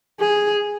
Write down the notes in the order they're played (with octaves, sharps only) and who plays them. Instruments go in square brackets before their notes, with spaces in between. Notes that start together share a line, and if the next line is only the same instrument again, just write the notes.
[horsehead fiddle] G#4